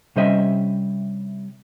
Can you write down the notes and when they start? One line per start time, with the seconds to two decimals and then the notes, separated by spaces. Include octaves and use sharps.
0.16 C3 G3 C#4 C5 D#5 E5